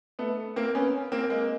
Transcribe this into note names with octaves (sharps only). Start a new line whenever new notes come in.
A3 B3
A#3 C4
B3 C#4
A#3 C4
G#3 A#3